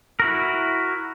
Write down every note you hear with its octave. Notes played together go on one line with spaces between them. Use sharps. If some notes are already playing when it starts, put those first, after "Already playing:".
E4 F#4 A#4